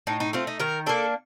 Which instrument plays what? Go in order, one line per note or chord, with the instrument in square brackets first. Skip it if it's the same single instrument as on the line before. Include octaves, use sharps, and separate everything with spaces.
[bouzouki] A2 D#4
D#4
A3 C4 F4
D#4
D#3 A#4
A#3 D4 A4